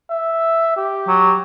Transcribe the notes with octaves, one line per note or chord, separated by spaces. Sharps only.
E5
G4
F#3